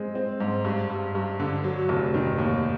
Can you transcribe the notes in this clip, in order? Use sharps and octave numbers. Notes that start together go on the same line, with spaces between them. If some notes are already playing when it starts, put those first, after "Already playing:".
Already playing: G#3 C4
C4
G#2
G2
G2
G2
D3
F#3
F1
D#3
D#2